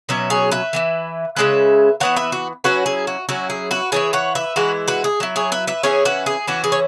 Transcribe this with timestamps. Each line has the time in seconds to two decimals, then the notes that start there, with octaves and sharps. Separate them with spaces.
0.09 B2 F#3 C#4 B4 E5
0.30 G#4 C#5
0.52 B4 E5
0.73 E3 B3 E4
1.36 C#3 E3 G#3 C#4 B4 E5
2.00 E3 B3 E4 C#5 F#5
2.16 B4 E5
2.32 F#4
2.64 F#3 C#4 E4 F#4 B4
2.86 G#4
3.07 F#4
3.29 F#3 C#4 E4 F#4
3.50 G#4
3.71 F#4 B4
3.92 E3 C#4 E4 G#4 C#5
4.13 C#5 F#5
4.35 B4 E5
4.56 E3 G#3 E4 F#4 B4
4.88 F#4 B4
5.04 G#4
5.20 F#3 E4
5.36 G#4 C#5
5.52 B4 E5
5.67 B4 E5
5.83 E3 C#4 E4 G#4 C#5
6.05 F#4 B4
6.26 G#4
6.47 E3 C#4 E4 F#4
6.64 G#4
6.72 C#5